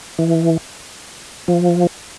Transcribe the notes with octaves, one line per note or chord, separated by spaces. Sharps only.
E3
F3